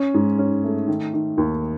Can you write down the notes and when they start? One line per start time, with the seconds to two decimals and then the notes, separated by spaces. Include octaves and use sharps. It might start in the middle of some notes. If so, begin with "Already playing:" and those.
Already playing: C#4
0.14 G#2
0.39 C#4
0.64 A3
0.88 D#3
1.14 D#3
1.38 D#2